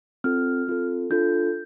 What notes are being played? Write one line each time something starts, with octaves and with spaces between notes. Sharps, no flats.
C4 F4 A4 F6
C4 F4 A4
D4 F4 A4 G6